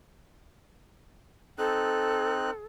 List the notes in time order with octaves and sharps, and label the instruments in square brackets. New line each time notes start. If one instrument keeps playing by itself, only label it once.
[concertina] C4 D#4 F#6 [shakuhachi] A4